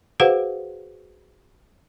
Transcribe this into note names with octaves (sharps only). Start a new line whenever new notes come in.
F#4 G#4 B4 C5 F5 F#5